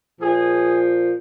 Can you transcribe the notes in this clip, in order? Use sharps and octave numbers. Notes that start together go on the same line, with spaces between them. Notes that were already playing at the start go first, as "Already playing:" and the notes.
A#2 F3 G#4